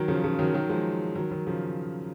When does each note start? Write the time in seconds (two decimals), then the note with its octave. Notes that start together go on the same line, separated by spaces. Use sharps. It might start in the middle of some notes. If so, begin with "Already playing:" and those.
Already playing: D#3 F#3
0.08 C#3 F3
0.23 C#3 F3
0.39 D#3 F#3
0.54 D#3 F#3
0.69 F3 G#3
1.16 D#3 F#3
1.31 D#3 F#3
1.47 C#3 F3